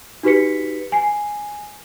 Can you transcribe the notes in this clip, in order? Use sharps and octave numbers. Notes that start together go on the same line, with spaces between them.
D#4 F#4 G4 B4 B6 C#7
G#5 C7